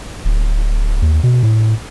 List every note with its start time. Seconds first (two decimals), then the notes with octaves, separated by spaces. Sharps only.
0.25 D1
1.02 D#2
1.23 B2
1.43 A2